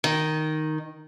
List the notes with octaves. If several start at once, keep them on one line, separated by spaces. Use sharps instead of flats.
D#3